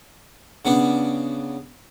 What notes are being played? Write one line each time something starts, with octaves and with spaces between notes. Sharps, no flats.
C#3 B3 D4